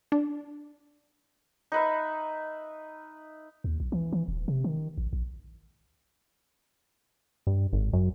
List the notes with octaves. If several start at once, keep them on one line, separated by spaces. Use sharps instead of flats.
D4
D#4 B4 E5
D#2
B1
E3
E3
D#1
C3
D#3
A1
A#1
G2
G#1
F#2